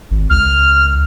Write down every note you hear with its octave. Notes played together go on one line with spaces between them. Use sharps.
G#1
C#2 F6